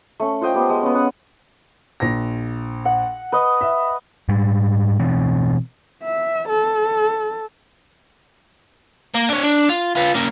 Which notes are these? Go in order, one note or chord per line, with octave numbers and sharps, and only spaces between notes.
A3 C#4
F4 C5 D#5 G5
B3 G4
G#3
B3 C#4
C#4 F#5 D#6
A#1 A#6
F#5
B4 D#5
E5
G#2 G3
B2 E3 C4
E5
A4
A#3
D4 C#5
D4
F4
F4 B4
A#3 C#4